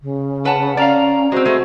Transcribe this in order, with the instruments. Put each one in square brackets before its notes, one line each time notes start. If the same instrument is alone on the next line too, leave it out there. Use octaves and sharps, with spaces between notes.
[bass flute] C#3
[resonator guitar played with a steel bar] B4 A5 [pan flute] F#5
[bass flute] C#4 [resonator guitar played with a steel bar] D5 F5 [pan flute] A#5
[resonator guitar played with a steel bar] G#3 C4 [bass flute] F#4 [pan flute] C5
[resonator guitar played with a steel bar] G#3 A3